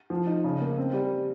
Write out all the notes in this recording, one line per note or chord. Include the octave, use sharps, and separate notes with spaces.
F3
D#4
C#3
A#3
C4
G3